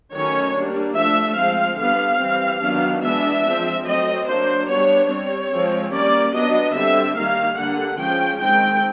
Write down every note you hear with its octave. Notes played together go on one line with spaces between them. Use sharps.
D#3 F#3 A3 C#4 C#5
G3 A#3 D4
F3 A3 D4 E5
F3 G#3 C4 F5
D3 G3 B3 F5
E3 G3 C4
D#3 F#3 B3 D4
E3 G#3 B3 D4 E5
F3 G#3 C4
F#3 A3 C4 D#5
F#3 A#3 D4 C5
G3 B3 D4 C#5
G3 C4 C#5
F3 G#3 C4
G3 A#3 C#4 D5
F#3 B3 D4 D#5
D3 G3 C4 E5
D#3 G3 A#3 F5
D3 G3 A#3 F#5
F3 G#3 C#4 G5
D#3 G#3 C4 G5